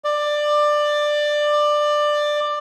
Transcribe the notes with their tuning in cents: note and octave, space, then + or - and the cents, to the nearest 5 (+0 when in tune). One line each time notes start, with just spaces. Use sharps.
D5 +15